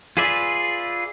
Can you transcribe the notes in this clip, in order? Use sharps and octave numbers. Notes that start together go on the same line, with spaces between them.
F4 G#4 B4 D5 E5